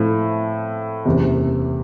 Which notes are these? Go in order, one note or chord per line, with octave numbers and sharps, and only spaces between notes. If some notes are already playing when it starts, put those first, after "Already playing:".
Already playing: A2 F3 A3 C4 E4
F#1 E2 C3